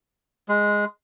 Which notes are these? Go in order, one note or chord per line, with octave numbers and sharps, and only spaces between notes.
G#3